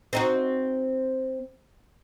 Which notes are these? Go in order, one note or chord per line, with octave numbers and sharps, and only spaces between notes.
C4 D#4 F#4